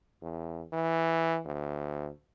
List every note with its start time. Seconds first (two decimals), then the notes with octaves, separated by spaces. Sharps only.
0.22 E2
0.73 E3
1.45 D2